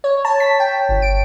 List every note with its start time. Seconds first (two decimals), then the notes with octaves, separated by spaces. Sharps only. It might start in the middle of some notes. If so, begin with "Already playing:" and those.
0.04 C#5
0.25 A5
0.40 B6
0.60 G5
0.89 G1
1.02 D7